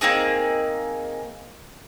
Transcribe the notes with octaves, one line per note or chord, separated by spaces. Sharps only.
A#3 C4 D#4 G#4